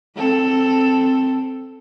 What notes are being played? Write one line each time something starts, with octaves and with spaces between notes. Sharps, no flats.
C4 A4